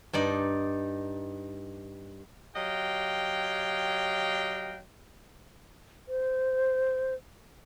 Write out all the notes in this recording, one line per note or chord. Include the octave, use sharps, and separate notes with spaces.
G2 D#4 D5
F#3 G4 D#5 F5 G5
C5